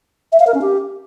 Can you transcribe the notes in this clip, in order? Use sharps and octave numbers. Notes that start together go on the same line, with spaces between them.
E5
F5
A#4
C#4
G4